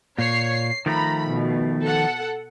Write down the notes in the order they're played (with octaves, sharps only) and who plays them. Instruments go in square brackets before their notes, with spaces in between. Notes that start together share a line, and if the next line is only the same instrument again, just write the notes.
[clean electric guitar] A#2 [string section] C#5 C7
[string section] C7
[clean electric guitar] D#3 F3 A3 [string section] A#5 B5
[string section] B2
A4 F#5